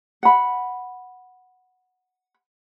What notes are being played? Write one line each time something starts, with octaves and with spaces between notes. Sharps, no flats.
F#5 B5